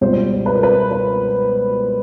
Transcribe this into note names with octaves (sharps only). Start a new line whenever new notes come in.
C#2 B2 G3 C5
B4
A#4
B4
B4